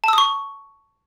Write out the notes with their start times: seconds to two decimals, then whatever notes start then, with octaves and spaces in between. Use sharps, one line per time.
0.04 A5
0.08 E6
0.13 D#6
0.18 C#6